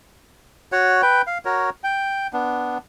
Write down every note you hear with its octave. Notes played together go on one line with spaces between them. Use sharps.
F#4 C#5 F#5
B4 G5
F5
F#4 A#4 C#5
G5
B3 D4